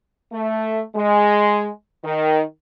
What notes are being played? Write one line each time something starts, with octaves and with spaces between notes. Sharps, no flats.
A3
G#3
D#3